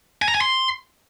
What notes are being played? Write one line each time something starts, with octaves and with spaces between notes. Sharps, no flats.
G#5
A#5
G#5
C6